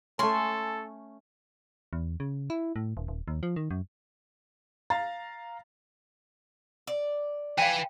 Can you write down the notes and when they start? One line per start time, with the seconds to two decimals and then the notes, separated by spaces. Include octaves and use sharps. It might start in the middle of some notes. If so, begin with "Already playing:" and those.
0.19 A3 C#4 A4 G#5 C6
1.93 E2
2.20 C#3
2.50 E4
2.76 A2
2.97 D#1
3.08 D#1
3.28 D#2
3.43 F3
3.56 D#3
3.71 F#2
4.90 F5 A#5 A6
6.87 D5
7.58 B4 F5 G5 G#5